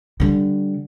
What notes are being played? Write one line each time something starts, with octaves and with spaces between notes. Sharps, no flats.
D3 G3